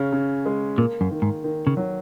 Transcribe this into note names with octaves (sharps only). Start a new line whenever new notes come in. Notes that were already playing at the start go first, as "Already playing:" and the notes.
Already playing: C#3 C#4
C#3
G#3
A#2 A#3
F#2
D#3
G#2
D#3
C#3
F#3